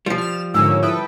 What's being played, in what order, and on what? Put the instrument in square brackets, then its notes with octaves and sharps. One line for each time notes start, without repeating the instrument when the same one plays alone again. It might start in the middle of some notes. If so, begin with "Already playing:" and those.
[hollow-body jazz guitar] F3 G3 [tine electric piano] F4
[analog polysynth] F6 E7
[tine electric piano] G#2 D3 [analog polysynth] A#3 C#4 [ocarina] E6
[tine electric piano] E4 [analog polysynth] A4 B4 G5 [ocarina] D#6